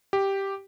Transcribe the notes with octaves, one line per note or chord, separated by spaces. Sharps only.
G4